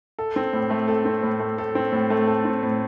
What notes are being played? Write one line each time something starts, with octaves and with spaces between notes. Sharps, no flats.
A4
C4
A2
A3
A4
C4
A2
A3
A4
C4
A2
A3
A4
C4
A2